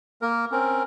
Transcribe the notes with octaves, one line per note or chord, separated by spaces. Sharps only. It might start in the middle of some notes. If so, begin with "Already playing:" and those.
A#3 A#4
C4 C#4 A#4